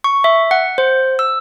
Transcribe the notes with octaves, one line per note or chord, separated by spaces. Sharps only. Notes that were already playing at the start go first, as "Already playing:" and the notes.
C#6
E5
F#5
C5
E6